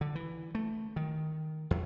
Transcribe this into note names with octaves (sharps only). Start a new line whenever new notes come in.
D3
E3
A3
D#3
E2